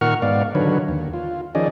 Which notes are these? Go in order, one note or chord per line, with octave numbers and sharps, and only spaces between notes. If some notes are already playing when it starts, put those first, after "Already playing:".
A#2 D#3 A#4 F#5 C#6 F6
G#2 B3 D5 F5
D3 D#3 F#3 B4 C#5
D#2
F4
D#3 F3 C#4 G#4 D5 D#5